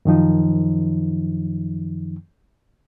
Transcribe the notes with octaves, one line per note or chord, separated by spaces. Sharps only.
F#2 D#3 F3 D#4